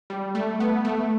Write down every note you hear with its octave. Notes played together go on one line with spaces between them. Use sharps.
G3
A3
B3
A3